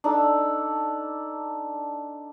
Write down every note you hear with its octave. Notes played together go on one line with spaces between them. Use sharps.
D4 D#4 A4